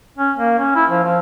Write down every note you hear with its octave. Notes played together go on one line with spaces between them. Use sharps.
C#4
A#3
C#4
E4
F3
F3